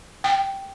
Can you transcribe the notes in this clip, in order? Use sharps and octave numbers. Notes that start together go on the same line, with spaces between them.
G5